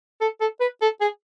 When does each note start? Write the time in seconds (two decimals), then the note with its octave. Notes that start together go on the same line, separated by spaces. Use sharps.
0.21 A4
0.40 A4
0.60 B4
0.82 A4
1.01 G#4